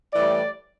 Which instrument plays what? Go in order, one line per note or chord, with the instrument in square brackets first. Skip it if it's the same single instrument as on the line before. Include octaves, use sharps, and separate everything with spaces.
[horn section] A2 E3 G3 D5